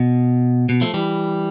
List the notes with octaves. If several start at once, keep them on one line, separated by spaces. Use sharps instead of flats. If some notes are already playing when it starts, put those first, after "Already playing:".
Already playing: B2
B2
F3 A3
E3 G3